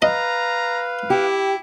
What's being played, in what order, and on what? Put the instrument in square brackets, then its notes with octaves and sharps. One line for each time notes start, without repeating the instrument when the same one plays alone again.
[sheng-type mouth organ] B4 F5 [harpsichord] D#5 [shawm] A#5
[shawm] E4 [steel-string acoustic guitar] G4